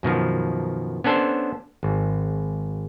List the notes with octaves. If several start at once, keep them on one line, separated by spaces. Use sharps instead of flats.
F#2 B2 D#3 F3
B3 C#4 D4 A4 C5
G#1